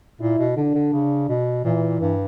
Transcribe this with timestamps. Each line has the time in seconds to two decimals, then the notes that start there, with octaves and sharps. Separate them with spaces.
0.20 A#2 E4
0.39 B2
0.56 D3 D4
0.74 D3
0.93 C#3
1.29 B2
1.64 A#2 E3
2.01 G2